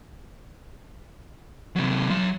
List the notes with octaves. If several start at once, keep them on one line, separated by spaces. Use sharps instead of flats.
C3 F#3
F#3 C6